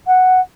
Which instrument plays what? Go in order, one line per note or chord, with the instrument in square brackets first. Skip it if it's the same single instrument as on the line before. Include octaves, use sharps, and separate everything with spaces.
[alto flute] F#5